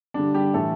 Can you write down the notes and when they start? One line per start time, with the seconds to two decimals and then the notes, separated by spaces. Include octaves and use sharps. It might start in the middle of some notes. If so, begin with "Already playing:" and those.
0.14 D3 G3 D4
0.34 G3 G4
0.54 A2 E3 A3 A4